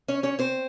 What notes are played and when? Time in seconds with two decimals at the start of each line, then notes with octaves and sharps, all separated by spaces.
0.08 C#4 C#5
0.23 C#4 C#5
0.39 C4 C5